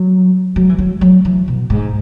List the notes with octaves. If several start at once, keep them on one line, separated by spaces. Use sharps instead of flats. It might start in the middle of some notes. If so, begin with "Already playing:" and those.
Already playing: F#3
F#3
E3
F#3
F#3
E3
B2
G#2